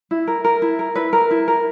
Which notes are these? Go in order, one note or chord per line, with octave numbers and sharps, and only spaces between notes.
E4
A#4
A#4
E4
A#4
E4 B4
A#4
E4
A#4